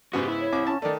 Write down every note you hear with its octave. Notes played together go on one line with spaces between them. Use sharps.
G#2 C#3 B3 F#4 G4
E4
C#5
C2 D6
C#4 A5
D#3 A3 D5